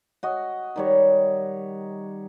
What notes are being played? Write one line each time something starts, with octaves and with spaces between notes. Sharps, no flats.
F#4 D#5
D#3 G3 C#5